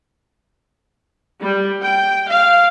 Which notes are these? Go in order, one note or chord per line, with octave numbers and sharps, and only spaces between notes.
G3
G5
F5